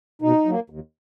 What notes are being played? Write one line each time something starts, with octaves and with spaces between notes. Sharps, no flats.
B2 D#4
F#3 A#3
D#2